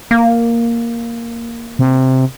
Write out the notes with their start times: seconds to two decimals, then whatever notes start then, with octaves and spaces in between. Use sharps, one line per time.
0.11 A#3
1.79 C3